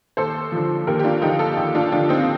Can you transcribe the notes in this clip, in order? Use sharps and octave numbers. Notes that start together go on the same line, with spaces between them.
D#2 A4 C5
D3 F3
D#2 G4 A#4
G4
D4 F4
D3 F3 D#4 G4
F4 A4
D#2 D#4 G4
D4 F4
D3 F3 D4 F4
C4 D#4